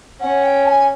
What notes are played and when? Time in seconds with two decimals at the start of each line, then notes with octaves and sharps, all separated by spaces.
0.20 C#4 F#5
0.43 G5
0.65 A5
0.69 G#5